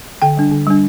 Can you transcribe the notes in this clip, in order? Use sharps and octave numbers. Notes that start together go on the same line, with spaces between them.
D3 G5
G3 D4
D3
G3 D4